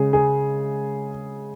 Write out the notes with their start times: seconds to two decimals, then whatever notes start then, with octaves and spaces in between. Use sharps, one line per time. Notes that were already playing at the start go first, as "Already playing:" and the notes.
Already playing: C#3 G#3 G#4
0.13 G#4